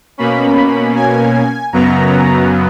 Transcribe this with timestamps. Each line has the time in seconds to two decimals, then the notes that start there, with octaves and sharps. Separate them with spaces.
0.18 B2 A#3 C#4 B5
0.95 G#5
1.73 F#2 C#3 F#3 B3 A#5